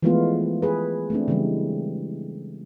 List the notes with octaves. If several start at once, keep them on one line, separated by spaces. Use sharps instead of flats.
E3 F3 G#3 A3 B3 F4
G#4 B4
A3 C4 D4
C#3 E3 G3 G#3